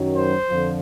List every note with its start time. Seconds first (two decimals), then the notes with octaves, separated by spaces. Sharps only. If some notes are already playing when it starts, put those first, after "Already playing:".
Already playing: F#2 D#3 F#3
0.17 C5
0.46 F2 D3 F3